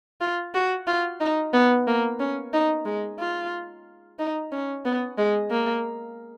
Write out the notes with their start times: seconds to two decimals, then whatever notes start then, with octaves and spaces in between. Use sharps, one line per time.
0.21 F4
0.54 F#4
0.87 F4
1.20 D#4
1.53 B3
1.87 A#3
2.19 C#4
2.53 D#4
2.85 G#3
3.19 F4
4.19 D#4
4.52 C#4
4.85 B3
5.18 G#3
5.50 A#3